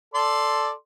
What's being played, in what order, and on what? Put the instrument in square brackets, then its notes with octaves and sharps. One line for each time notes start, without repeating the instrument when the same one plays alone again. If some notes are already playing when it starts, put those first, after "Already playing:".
[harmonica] A4 D5 C6